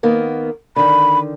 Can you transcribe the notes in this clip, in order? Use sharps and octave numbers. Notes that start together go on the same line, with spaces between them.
D#3 A#3 B3
D3 D#3 B5